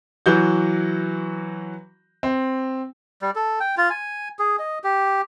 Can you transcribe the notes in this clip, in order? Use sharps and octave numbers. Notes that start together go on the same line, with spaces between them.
E3 F#3 F#4 G6
C4
G3
A4
G5
F4
G#5
G#4
D#5
G4